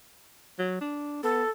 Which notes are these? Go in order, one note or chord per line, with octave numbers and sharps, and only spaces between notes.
F#3
D4
B3 A4